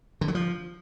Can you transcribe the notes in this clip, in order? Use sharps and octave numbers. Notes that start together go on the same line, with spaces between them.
D3
F#3
F3